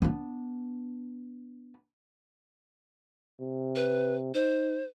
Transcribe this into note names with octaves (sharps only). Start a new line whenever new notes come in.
B3 D4
C3
B4
D#4 C5